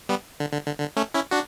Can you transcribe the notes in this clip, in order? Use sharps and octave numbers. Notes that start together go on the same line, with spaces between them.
G3 B3
D3
D3
D3
D3
A3 C#4
C#4 E4
D4 F#4